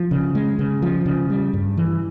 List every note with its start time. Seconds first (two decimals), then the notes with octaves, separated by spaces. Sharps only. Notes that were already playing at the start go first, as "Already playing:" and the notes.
Already playing: F3
0.11 C#3
0.35 G#3
0.59 C#3
0.82 F3
1.06 C#3
1.30 G3
1.53 G2
1.77 E3